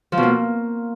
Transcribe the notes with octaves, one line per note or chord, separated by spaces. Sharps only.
F3
B2
A#3